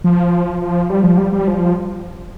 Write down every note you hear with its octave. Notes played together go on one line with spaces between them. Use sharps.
F3
F3
G3
F3
G3
G3
F3